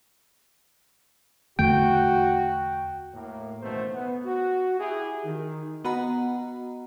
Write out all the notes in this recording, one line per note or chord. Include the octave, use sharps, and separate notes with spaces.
E2 D3 A3 F#4 G5
A2 A#3
A1 F#2 B2 D#3 A3 C5
B3
F#4
E4 G4 G#4
D#3
B3 F#4 D#5 F#5 A#5 B5